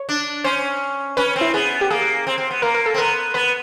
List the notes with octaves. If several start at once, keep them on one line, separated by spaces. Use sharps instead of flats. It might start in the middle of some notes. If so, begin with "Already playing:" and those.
Already playing: C#5
D4
C#4 C5
C#4 B4
C4
E4
B3 G#4
G4
A#3 G#4
C4
C4
B3
A#3 A#4
A#4
A4
C4
B3 A#4
B3 B4